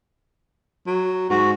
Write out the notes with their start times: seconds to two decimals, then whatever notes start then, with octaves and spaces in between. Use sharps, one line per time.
0.87 F#3
1.30 G#2 F#4